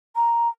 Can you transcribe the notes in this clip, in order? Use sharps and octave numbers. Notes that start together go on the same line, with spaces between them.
A#5